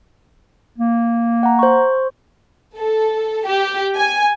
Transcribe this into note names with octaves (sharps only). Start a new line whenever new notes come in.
A#3
F#5 A#5
C5 C#6
A4
G4
G#5